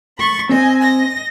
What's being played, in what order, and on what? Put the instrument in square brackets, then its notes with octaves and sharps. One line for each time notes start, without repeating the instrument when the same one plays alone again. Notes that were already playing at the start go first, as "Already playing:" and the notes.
[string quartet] B5 C#6 A6
[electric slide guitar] C4 C5 [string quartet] D#5 G#5
[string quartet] D#5 A#6